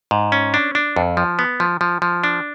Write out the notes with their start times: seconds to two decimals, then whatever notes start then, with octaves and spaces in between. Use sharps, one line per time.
0.11 G#2
0.32 C#4
0.54 D4
0.75 D4
0.96 F2
1.17 F3
1.39 B3
1.60 F3
1.81 F3
2.02 F3
2.24 D4